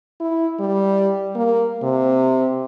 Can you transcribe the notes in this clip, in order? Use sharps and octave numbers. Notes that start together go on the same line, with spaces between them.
E4
G3
A#3
C3